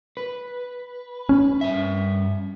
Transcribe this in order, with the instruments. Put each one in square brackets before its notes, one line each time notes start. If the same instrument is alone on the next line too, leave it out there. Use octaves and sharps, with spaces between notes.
[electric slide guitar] B4
[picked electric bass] C#4
[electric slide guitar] G2 E5